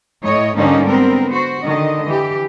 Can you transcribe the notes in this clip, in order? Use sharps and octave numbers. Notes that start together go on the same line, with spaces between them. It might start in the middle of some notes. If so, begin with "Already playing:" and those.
A2 C#5 D#5
G#2 D3 G3 A#3 C#4 D#4
B3 C4 A#4
F#4 C5
D3 D#3 D#5
E3 G4